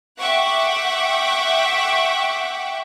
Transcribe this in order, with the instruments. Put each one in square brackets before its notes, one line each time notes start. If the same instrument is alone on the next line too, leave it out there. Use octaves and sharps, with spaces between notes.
[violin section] E5 F#5 G5 C#6 D6 F#6